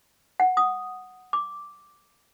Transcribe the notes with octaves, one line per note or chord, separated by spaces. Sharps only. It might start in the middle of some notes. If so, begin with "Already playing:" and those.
F#5
D#6
D6